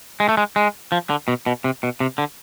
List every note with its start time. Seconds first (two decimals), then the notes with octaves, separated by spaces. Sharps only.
0.20 G#3
0.29 A3
0.37 G#3
0.56 G#3
0.92 F3
1.10 D3
1.28 B2
1.46 B2
1.64 C3
1.83 B2
2.00 C3
2.18 D3